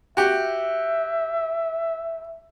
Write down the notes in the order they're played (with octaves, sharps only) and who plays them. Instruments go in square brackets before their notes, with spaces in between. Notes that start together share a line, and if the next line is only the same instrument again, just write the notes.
[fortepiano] F#4 G4 [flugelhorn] E5